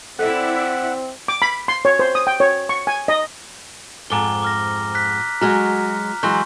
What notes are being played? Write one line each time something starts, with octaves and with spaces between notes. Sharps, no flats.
C4 E4 A4 D5 E5 F#5
D6
B5
C6
C#5
C5
D#6
G5
C#5
C#6
G#5
D#5
F2 G#2 A#5 D6 G7
D6 F6 A#6
F#6 B6
F#3 G#3 F#4 A#5 F6
E3 F#3 G#3 C6 C#6 G6